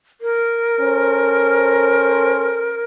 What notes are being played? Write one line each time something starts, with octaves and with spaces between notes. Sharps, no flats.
A#4
C#4 A4 C5